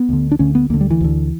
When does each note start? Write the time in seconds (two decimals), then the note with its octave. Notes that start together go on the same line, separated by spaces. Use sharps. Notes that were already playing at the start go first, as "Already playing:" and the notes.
Already playing: B3
0.09 D2 D3
0.32 D4
0.39 D2 D3 C#4
0.55 B3
0.70 D2 A#3
0.74 D3
0.81 G3
0.90 E3
1.01 D2 D3